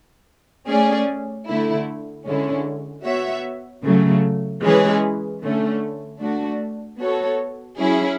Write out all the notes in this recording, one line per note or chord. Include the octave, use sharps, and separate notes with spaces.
A3 C#4 G#4 D5
D3 A3 E4
D3 G#3 C#4 E4
B3 F#4 C#5 E5
C#3 F#3 A3
E3 G#3 C#4 G#4 B4
D3 A3 C#4
A3 D4 F#4
B3 F#4 A4 C#5
F#3 C#4 E4 G#4